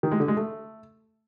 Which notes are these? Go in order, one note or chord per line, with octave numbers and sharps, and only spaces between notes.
D#3
G#3
D3
G#3
A3